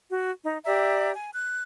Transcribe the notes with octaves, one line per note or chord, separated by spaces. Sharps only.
F#4
D#4
G4 D5 E5 A#5
G#5
F#6